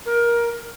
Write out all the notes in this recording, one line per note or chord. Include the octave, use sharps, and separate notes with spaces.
A#4